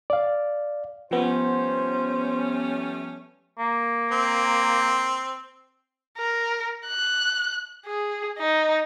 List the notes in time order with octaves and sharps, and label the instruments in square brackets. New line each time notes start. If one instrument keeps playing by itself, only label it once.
[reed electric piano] D5 F5
[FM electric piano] F3 B3 [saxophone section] G3 A3 C#4 [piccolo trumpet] C5
[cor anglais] A#3
[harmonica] C4
[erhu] A#4
F#6
G#4
D#4